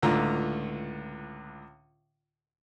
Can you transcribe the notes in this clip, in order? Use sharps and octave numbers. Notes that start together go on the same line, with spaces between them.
C#2 A2 D3 F4 A#5